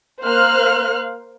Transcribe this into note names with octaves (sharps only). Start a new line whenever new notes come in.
A#3 C5 F5 F6 F#6